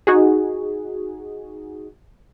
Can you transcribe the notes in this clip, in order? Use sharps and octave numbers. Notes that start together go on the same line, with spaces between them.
D#4 F#4 G#4